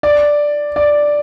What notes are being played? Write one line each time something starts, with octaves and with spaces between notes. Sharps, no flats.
D5
D5